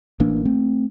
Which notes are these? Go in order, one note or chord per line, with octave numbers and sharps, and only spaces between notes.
A1 E3 A#3 D4
A3 C4